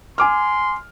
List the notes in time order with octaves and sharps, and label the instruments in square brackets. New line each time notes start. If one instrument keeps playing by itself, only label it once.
[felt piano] G#5 D6 F6 [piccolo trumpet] C6